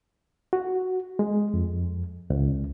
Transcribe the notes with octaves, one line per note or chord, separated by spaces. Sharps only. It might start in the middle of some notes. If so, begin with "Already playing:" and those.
F#4
G#3
F2
C#2